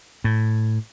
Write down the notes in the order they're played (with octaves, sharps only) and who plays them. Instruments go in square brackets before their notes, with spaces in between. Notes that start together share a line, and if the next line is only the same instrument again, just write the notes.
[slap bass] A2